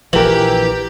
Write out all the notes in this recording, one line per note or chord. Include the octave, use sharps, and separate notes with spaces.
A#1 E3 F3 G4 A#4 F#7